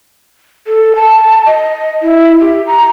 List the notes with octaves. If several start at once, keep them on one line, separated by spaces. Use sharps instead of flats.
A4
A5
D#5
E4
G4
A#5